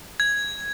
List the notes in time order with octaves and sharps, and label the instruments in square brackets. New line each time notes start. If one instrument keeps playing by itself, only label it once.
[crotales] G#6